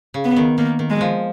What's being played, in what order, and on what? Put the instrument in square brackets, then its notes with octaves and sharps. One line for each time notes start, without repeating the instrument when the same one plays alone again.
[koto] C#3
[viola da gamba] B3
[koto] D#3
[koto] D#3 [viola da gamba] A#3
[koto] D#3
[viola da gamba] G#3
[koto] F3